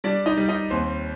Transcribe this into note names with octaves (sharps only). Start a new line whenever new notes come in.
G3 D4 D5
D#4 D#5
G3
D#4 D#5
D#2 C4 C5